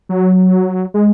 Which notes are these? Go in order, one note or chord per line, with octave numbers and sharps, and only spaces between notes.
F#3
G#3